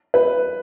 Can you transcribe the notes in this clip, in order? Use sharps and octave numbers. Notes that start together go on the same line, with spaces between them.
B4